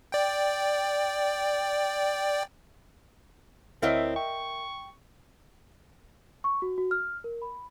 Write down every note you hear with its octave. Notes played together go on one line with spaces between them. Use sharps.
D5 G5
D2 C4 E4 A#4 C#5 D#5 E5
G5 C#6
C#6
F#4
F#4
F6
A#4
B5